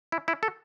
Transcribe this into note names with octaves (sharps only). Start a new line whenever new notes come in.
E4
E4
A4